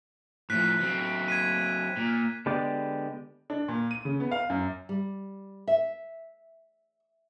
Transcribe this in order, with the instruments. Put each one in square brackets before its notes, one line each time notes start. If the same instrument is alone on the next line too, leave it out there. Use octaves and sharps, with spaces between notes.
[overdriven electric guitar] A2 F3 [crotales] F#6 B6
[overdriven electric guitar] F#3 C4
[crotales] G#6 B6 D#7
[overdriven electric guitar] A#2
[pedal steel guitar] D3 G#3 B3 G4 D5
[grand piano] D4
A#2
D#7
C#3
B3
F5
F#2
[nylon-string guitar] G3
E5